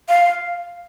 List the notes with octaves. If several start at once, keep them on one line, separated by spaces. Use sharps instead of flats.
F5